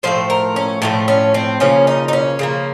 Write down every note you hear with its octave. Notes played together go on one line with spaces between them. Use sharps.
A2 F3 A3 C5
A#4
C#4
A2 F3 A3 C4
C#4
C4
C#3 F3 A#3 C#4
D#4
D#4
C#4
C#3 F3 A#3